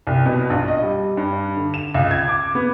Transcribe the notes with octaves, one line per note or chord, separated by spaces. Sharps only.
C2
B2
A#1
D#5
G3
G2
D3
E7
C#2
G#6
D6
B3